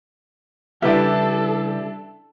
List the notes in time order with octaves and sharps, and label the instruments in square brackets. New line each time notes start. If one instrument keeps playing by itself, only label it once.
[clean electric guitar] C#3 E3 G3 [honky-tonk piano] D4 E4 [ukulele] G4 B4 [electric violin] A4